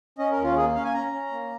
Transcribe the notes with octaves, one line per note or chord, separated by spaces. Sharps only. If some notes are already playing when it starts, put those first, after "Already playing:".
C#4 D#5
A#4
D#2
F4
A#3 G#4
C#4 F5
G#5
C#4 A#5
C#4
A#3